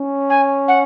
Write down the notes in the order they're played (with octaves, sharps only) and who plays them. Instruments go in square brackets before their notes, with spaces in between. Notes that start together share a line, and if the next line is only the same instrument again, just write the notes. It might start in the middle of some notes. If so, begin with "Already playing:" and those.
Already playing: [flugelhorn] C#4
[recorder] G#5
F#5